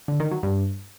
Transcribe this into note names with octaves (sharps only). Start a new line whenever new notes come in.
D3
D#3
F#3
G2